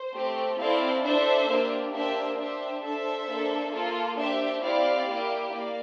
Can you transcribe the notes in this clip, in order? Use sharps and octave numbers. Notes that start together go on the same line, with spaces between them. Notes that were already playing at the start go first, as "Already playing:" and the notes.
Already playing: C5
A3 C4 G4
C4 E4 A4 D5 F5
D4 A4 C5 E5
A#3 D4 G4
A#3 D4 G4 C5 E5
D4 G4 C5 E5
D4 A4 C5 E5
A#3 D4 A4
A#3 F4 A4
D4 G4 C5 E5
C4 E4 G4 D5 F5
A#3 E4 G4
A#3 D5 F5